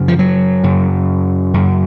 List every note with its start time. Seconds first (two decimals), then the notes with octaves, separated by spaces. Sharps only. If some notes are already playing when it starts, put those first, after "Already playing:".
Already playing: F#2 C#3
0.08 F3
0.19 F#3
0.64 F#2 C#3
1.54 F#2 C#3